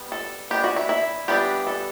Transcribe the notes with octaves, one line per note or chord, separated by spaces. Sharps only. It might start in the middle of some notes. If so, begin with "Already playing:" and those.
Already playing: G3 B3
A4
E3 B3 D4 G4
F#4
E4
E4
E3 G3 B3 D4 G4
A4